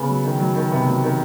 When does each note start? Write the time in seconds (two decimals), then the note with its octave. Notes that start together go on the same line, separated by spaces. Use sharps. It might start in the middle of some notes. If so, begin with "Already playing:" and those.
Already playing: C#3 B3
0.09 F#3
0.25 D#3
0.40 F#3
0.55 D#3
0.71 C3 B3
0.87 F#3
1.03 D#3